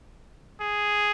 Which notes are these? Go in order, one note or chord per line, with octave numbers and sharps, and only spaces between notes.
G#4